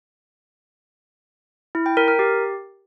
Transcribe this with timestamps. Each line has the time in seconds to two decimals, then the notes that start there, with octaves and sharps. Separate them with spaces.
1.75 E4
1.86 G5
1.97 A#4
2.08 A#4
2.19 G4